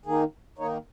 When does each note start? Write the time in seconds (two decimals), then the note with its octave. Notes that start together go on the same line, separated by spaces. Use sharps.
0.06 D#3 A#3 D#4 G#4
0.58 D#3 A#3 D#4 C#5